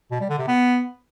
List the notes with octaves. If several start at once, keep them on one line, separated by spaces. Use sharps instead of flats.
B2
G3
D3
C3
B3